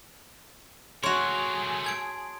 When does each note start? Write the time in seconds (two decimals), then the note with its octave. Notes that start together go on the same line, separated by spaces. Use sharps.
1.04 A3 F#4 G#4 A#4 C#5 C6 F7
1.84 A5 G#6 D7